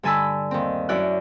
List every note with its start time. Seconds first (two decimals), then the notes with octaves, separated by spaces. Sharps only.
0.03 G2 D3 G#5 A5 B5 E6
0.51 D#2 C4
0.89 F#2 E4 C#5 D5 F#6